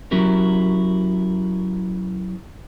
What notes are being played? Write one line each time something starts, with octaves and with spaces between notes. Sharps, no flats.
F#3 C#4 E4 G4 A#4